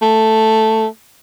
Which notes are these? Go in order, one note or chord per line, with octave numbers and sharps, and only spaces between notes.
A3